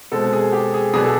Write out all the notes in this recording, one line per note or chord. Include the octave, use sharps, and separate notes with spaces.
B2 G#3 C4 A4
G#4
G4
G#4
B2 F#3 B3 D4 G#4
A4